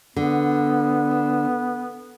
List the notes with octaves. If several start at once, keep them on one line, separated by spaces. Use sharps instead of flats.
D3 B3